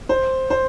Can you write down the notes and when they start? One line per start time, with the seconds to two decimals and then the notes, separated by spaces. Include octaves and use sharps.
0.09 C5
0.50 C5